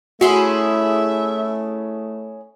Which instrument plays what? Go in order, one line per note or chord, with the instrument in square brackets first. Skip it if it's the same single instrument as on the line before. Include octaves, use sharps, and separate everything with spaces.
[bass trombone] A3 [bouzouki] C#4 E4 G#4 [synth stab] F#4 C6 [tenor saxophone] E5